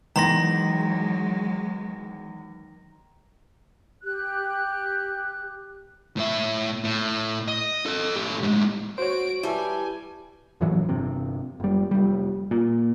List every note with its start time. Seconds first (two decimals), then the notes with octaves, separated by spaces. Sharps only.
0.16 E2 D#3 F#3 G#3 A#5 C6 A#6
4.03 G4 F#6
6.17 A2 E5
6.84 A2
7.48 D#5
7.86 A4 D#5
8.16 A2 G4
8.43 A2 G#3
8.98 F#4 C5 C#5 D7
9.43 G3 E4 B4 E5 G#5 A5
10.61 E2 A2 E3 F#3
10.88 G1 C3
11.60 F#1 G3
11.91 F1 G3
12.51 A#2